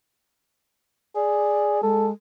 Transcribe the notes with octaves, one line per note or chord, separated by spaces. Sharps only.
G#4 D5
G#3 A4